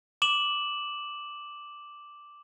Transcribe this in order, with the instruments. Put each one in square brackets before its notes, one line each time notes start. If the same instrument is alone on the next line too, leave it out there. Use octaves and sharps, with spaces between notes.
[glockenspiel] D6 E7 F#7